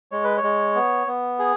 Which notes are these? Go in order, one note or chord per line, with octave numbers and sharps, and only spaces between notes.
G#3 C#5
B4
C#5
G#3
B3
B3
G#4